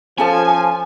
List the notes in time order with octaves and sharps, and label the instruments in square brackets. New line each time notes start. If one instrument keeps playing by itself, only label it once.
[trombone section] F3 [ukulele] C#4 A4 A5 [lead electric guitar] G#5